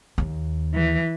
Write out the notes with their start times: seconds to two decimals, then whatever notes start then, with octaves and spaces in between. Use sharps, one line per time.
0.18 D#2
0.74 E3